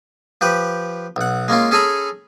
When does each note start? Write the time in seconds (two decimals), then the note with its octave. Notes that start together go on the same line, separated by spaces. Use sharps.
0.41 F3 G4 B4
1.16 B1 F#5
1.48 G#3 A#3 C#4 F4
1.71 C#4 G#4 A4 G#5 A#5 B5